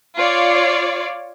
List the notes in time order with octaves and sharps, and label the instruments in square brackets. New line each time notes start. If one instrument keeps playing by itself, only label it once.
[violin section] F4 C#5 D5